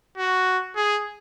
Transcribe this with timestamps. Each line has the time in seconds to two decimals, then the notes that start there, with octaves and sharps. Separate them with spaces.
0.18 F#4
0.76 G#4